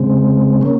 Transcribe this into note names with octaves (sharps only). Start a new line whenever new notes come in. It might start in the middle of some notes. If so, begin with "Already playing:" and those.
Already playing: C#3 G#3 C4
A#3 C#4